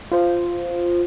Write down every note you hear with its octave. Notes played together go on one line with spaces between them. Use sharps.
F4 C5